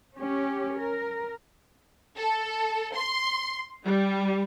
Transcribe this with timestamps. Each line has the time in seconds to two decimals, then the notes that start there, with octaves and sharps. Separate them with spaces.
0.17 C#4 G4
0.78 A#4
2.18 A4
2.96 C6
3.84 G3